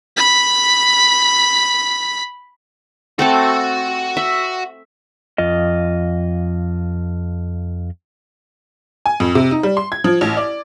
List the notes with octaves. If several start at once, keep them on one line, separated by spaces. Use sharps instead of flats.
B5 B6
A3 C4 F#4 A4 F#5
E5
F2 F4 D#5
G#5
F2
C3
D#4
G3
C6
G#6
F3
A1
D5